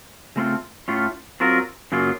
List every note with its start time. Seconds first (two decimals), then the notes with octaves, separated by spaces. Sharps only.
0.36 C#3 A3 C4 F4 A4
0.88 A2 A3 C#4 F4
1.40 F#3 C4 F4 A#4
1.92 F#2 C#3 F#3 A#3 F4